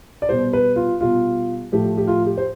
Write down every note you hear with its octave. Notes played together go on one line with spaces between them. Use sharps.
D5
B2 G3 C5
B4
F4
B2 G3 F4
A2 F3 A3 G4
G4
F4
G4
C5